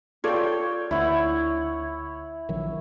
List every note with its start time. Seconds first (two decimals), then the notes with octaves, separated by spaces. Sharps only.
0.24 F4 A4 C#5 D5 G5
0.91 D2 E4 C#5 F#5
2.49 A#1 D#3 F#3